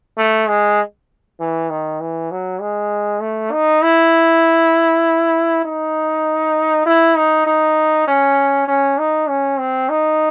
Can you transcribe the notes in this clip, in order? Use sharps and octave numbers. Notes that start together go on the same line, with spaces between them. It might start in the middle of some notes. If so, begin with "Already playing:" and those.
A3
G#3
E3
D#3
E3
F#3
G#3
A3
D#4
E4
D#4
E4
D#4
D#4
C#4
C#4
D#4
C#4
C4
D#4